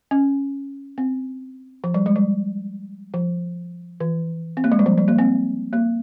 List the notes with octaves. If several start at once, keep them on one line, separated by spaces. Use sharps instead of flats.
C#4
C4
F3
G3
G#3
G3
F3
E3
C4
A#3
G#3
G3
F3
G3
A#3
C4
A#3